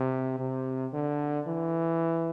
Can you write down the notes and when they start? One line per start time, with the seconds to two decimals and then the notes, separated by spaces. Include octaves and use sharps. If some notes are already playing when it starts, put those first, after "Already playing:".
Already playing: C3
0.39 C3
0.93 D3
1.47 E3